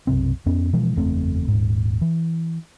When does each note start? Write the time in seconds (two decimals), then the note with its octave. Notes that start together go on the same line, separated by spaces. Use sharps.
0.07 B1 F#2 C3 C4
0.46 F2 B3 C#4
0.73 B2 E3 F3 G#3
0.96 F#1 E2 A3 C4
1.48 D#1 G#2
2.01 E3